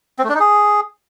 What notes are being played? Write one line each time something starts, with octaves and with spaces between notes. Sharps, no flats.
C4
A3
D4
D#4
G#4